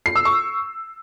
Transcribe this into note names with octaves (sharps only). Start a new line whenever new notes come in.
C7
E6
C#6